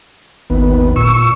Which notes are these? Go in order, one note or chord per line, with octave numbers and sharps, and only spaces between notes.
G#1 D#2 B3
A#2 C#6 E6